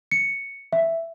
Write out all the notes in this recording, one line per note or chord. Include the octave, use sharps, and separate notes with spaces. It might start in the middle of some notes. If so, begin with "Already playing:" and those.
C#7
E5